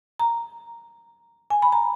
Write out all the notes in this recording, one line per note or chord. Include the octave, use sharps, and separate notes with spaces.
A#5
G#5
B5
A#5